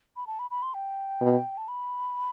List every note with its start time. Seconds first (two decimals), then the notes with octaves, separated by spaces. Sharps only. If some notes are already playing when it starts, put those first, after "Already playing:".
0.16 B5
0.27 A5
0.39 B5
0.51 B5
0.62 C6
0.74 G5
1.21 B2
1.57 A5
1.68 B5